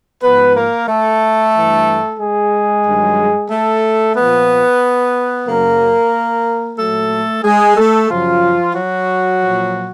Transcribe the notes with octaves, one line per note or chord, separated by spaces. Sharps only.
G#2 F3 B3 B4
A#3 A#4
A3 A4
G2 E3
G#3 G#4
G2 D#3 F#3
A3 A4
A#2 F3 B3 B4
F#2 C#3 F#3 A#3 A#4
A#2 F#3 A3 A4
G#3 G#4
A3 A4
F#2 C#3 F3 F#3 F4
F#3 F#4
A#2 F3